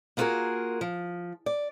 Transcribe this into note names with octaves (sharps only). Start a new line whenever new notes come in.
A#3 B3 F4 F#4 G#4 A#4
F3
D5